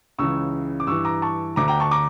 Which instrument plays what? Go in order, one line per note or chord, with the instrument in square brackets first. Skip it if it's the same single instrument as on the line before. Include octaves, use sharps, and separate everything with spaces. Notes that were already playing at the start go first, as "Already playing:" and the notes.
[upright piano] C#2 C#3 E3 C#6 E6
D6
G2 E3 C#6 E6
A#5 D6
A5 C#6
D2 D3 A#5 D6
G5 A#5
A5 C#6
A#5 D6